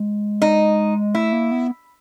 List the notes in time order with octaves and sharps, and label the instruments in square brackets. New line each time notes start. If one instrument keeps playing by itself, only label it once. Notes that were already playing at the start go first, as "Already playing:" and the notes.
Already playing: [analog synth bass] G#3
[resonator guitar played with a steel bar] D#4
[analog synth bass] A3 [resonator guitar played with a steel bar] E4
[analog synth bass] A#3
B3